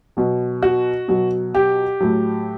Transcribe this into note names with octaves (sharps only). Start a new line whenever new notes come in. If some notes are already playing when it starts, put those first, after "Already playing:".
B2 F#3
F#4
B2 F#3
G4
A2 F#3